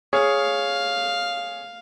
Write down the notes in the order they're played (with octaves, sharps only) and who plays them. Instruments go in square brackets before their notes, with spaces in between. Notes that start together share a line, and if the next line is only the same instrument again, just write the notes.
[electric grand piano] G#4 C#5 [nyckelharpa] F5